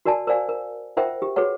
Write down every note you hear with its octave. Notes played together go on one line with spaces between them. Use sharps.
F#4 A#4 D5 G#5 A5
A#4 C5 D5 F5 G#5
A#4
F4 A#4 C5 E5 F#5 G5
G4
F#4 G#4 B4 C#5 F#5